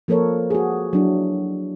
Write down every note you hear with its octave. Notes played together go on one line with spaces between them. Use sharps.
F3 A#3 A4 A#4 C#5
F#4 G#4
F#3 D4 E4